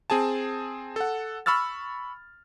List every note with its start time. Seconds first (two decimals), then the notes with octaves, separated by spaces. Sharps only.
0.10 C4 G#4 G#5 A5
0.96 A4 F#5
1.46 B5 C#6 E6 F6 A6